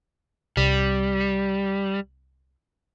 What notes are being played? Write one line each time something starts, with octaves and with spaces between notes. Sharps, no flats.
C2 G3